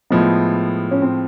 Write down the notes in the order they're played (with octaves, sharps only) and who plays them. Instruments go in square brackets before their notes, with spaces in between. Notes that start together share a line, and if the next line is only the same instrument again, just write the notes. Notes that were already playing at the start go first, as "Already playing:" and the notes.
[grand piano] A2 F3 G#3 [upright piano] B3
[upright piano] C#4
C4